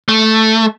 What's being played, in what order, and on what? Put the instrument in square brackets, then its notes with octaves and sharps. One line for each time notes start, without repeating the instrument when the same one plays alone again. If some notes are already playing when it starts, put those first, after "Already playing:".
[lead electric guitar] A3